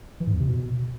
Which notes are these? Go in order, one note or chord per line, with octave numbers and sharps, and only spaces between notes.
E3
G#2
E2
C3
B2